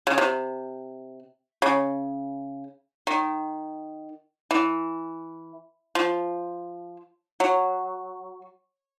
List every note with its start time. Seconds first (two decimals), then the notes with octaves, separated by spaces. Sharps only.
0.07 C#3
0.18 C3
1.62 C#3
3.07 D#3
4.51 E3
5.95 F3
7.40 F#3